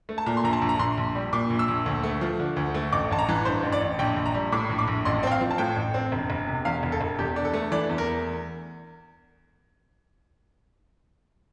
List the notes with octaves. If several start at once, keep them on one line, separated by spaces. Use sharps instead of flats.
A3
A5
A#2 A#5
C6
A#1 A#5
A5
A#1
A#5
A#1 C6
A#1
G3
A#2 D6
A#1
E6
A#1
D2
A3
F3
D3
D2
A3
A1 D6
A1 A5
A#5
E3
G2 C5
A1
D5
A1
A#1 G5
A#1
A#5
G3
A2 D6
A#1
D6
A#1
A1 C6
C4 G5
F5
F3
A5
A2 G5
A1
C4
E1
E1
C3
E2 F5
E1
A4
E1
E2 G4
D4
A4
A3
E3 D5
E2
A#4